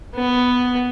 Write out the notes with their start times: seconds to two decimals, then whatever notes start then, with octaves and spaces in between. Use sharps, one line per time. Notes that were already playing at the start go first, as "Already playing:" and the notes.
0.15 B3